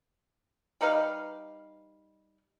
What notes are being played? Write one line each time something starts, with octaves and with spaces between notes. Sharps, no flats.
G3 D#4 B4 F5